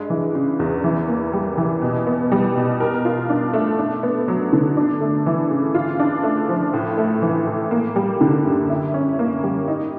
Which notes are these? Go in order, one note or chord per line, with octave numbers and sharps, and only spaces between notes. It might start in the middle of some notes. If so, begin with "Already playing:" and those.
Already playing: G2 G#3
E3
C#3
E2
E3
A#3
G3
E3
B2
B3
G3
B2
A#4
F4
D4
A3
D4
B3
F#3
D3
D4
A3
E3
C#3
F4
D4
A3
F3
A2
A3
E3
A2
A#3
G3
D3
F#2
E4
C#4
A#3
G3
D#4